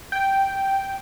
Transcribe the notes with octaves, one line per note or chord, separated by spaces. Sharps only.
G5